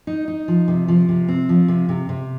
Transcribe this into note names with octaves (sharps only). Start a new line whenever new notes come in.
D#4
D#4
F3
C3
F3
C3
C4
F3
C3
C3
C3